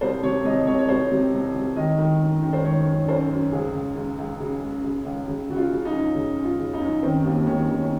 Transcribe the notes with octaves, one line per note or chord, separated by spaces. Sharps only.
C2 C5
C3 C#5
C2 D#5
C2 C#5
C#5
C2 C5
C3
C2
C2
D#3 D#5
D#3
F#2
D#3
C5
D#3 C#5
F#2
F#2 C5
F#2
C#2 G#4
C#2
C#2
C#2
C#3
C#2
C#3
C#2
C#3
C#3 F#4
F4
C#3
D#4
F#2
C#3
F#2
F4
C#3
D#4
F#2
D#3 C4
D#2
D#3 C#4
D#3
C#4